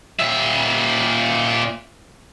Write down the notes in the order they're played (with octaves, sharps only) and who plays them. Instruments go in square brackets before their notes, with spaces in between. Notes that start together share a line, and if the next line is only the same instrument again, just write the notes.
[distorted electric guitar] A#2 E5